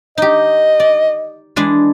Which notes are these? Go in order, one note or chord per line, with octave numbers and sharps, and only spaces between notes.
D#4 G4 D#5
D5
E3 G#3 D4